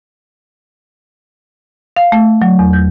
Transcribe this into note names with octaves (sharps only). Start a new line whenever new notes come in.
F5
A3
F#3
E2
G6